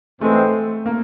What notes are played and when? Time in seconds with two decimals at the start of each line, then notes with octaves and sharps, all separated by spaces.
0.21 G#2 E3 G#3 A3 C4
0.86 A#3